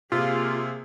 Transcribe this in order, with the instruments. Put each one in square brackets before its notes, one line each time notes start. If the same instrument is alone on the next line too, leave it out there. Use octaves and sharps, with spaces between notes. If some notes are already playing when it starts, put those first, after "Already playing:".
[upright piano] C3 [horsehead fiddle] A#3 G#4 [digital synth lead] F4